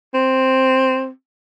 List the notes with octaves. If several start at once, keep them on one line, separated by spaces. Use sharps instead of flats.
C4